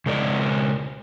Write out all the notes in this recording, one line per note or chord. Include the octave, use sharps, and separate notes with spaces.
C#3 G#3 A#4 D5